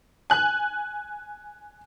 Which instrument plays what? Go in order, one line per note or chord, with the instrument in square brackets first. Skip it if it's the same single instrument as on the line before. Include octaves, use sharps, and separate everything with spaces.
[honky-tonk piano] G#5 F#6